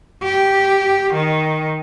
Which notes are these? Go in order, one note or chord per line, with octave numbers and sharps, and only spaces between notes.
G4
D#3